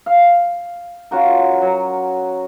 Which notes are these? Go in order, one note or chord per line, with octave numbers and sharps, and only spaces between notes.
F5
C#4 F4 F#4 A#4
F#3